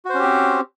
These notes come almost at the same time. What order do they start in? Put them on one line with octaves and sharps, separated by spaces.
F#4 C5 C#4 G4 C4